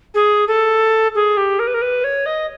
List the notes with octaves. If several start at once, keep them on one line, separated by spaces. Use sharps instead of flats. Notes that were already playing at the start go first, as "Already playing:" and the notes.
G#4
A4
G#4
G4
A#4
B4
A#4
B4
C#5
D#5